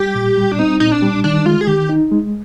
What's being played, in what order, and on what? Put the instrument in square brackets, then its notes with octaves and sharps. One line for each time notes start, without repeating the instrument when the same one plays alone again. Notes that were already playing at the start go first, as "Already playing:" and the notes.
Already playing: [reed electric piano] G3 [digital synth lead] G4
[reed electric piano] A#2
G3
[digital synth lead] D4
[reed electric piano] C4 [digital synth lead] D#4
[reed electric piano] A#2 [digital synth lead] D#4
[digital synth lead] D4
[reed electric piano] G3
[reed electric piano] D#3 [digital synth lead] D4
[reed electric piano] G#3 [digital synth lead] F4
[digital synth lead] G#4
[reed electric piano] D#3 [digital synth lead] G4
[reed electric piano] D#4
G#3